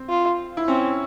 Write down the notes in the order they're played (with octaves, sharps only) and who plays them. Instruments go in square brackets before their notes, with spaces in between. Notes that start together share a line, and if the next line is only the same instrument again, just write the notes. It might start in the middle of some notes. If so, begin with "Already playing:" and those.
Already playing: [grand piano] C4
[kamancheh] F4
[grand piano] E4
[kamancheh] C4 [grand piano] C#4